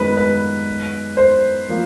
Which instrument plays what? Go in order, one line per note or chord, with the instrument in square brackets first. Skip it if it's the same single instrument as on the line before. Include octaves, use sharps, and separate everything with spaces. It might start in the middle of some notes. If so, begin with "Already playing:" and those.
Already playing: [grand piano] F#2 D#3 G#3 B3 [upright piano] B4
[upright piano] B4
C5
[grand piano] F3 A#3